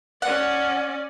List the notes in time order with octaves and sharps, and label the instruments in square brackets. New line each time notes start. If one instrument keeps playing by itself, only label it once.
[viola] C#4 D5 [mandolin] F#5